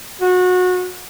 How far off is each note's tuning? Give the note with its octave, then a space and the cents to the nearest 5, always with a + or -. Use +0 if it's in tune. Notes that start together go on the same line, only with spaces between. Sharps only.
F#4 -25